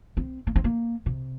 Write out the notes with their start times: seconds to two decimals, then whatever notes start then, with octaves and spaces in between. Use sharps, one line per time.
0.17 C4
0.47 A#3
0.56 C4
0.64 A#3
1.06 C3